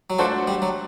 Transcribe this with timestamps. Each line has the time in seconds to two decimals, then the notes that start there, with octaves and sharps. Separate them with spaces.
0.10 F#3
0.19 F3 A3 D4 F#4 A4 C5
0.47 G3
0.62 F#3